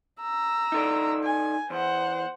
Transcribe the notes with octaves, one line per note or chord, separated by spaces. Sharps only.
A#5 E6
D#4 A4 D5
G#5
E2 C5 F#5